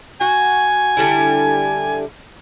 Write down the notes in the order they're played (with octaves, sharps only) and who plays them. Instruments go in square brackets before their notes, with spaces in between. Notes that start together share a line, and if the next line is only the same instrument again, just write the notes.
[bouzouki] F#4 [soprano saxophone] G#5
[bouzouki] D3 G3 E4